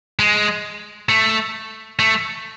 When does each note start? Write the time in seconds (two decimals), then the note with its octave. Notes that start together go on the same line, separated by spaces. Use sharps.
0.19 G#3
1.09 A3
1.99 A3